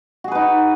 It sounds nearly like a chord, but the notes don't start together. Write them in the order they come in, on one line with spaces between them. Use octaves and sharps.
F#4 G#4 B4 D#4